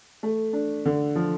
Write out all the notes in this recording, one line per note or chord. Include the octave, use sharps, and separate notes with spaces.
A3
D4
D3
F3